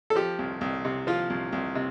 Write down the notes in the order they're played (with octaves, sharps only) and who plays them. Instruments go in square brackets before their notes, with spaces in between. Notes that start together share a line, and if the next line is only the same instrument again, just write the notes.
[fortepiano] A4
F3 G4
C2
C2
C3
F3 F4
C2
C2
C3